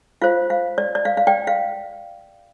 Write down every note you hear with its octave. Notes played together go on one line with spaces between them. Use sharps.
F4 C5 F5
F5
D5
D5
F5
F5
D5 G5
F5